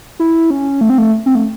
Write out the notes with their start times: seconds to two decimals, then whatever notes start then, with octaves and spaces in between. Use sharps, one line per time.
0.20 E4
0.50 C#4
0.81 A3
0.90 C4
0.98 A3
1.26 C4
1.35 A3